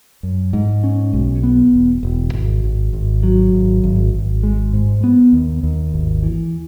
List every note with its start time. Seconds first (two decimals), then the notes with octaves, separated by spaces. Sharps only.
0.23 F#2
0.53 G#2
0.84 C#4
1.13 B1
1.43 B3
1.73 E1
2.03 E1
2.33 G#1
2.64 G#1
2.93 G#1
3.23 F#3
3.53 G#1
3.84 G#1
4.14 G#1
4.43 G#3
4.73 G#2
5.04 B3
5.33 D#2
5.63 D#2
5.93 G#1
6.23 E3